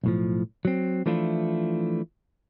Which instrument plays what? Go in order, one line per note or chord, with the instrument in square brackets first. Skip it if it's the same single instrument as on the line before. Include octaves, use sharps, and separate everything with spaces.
[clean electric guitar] B1 A2 F3
F#3 C4
E3 F3 A3 D4 E4 F4